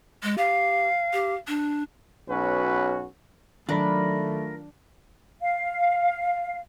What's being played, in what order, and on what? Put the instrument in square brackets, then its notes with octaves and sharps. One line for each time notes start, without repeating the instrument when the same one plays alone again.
[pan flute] G#3
[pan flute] G4 [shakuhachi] F5
[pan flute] G4
D4
[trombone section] B1 C#4 F#4 B4
[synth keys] D#3 F#3 [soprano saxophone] A3 [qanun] D4 [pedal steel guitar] F4 A#4 B5
[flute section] F5